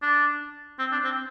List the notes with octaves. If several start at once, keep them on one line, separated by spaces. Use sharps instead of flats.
D4
C4
D4
C4